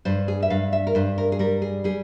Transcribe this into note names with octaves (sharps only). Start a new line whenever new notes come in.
G2 C5
G#4
E5
G2 F5
E5
A#4
G2 C5
A#4
G#4
G3 A#4
G#4
G3 G#4